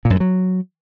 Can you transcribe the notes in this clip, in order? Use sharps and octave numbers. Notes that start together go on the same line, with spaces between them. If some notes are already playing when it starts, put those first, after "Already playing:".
A#2
F#2
G2
F#3